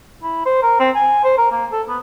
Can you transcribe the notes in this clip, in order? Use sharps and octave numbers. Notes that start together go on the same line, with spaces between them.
E4
C5
A#4
C4
G#5
C5
A#4
A#3
A4
B3